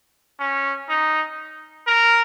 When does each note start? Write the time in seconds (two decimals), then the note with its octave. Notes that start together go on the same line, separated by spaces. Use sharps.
0.39 C#4
0.89 D#4
1.87 A#4